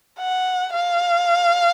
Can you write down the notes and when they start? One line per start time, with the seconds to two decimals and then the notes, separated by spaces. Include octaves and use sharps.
0.19 F#5
0.74 F5